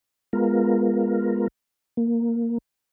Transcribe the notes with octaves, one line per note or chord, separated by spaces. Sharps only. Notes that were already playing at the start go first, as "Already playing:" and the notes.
G#3 B3 F4 A#4
A#3